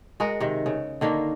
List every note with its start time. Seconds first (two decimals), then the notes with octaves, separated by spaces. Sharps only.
0.20 G#3 F#4 G#4 A#4
0.40 C3 D#3
0.66 C#3
1.01 D3 D#3 A#3 F5